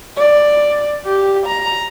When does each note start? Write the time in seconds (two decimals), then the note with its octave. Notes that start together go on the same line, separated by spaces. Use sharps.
0.16 D5
1.05 G4
1.46 A#5